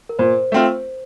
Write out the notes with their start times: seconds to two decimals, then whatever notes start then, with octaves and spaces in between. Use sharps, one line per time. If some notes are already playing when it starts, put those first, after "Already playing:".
0.09 A#4
0.19 A#2 C5
0.52 A3 C4 F4